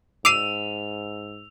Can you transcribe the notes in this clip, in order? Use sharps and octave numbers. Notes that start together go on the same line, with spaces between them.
G#2 D6 E6 C7 D#7 F7